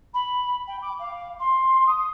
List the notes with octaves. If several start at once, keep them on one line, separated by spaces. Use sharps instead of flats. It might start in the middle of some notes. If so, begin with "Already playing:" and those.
B5
G5
D6
F5
C6
D#6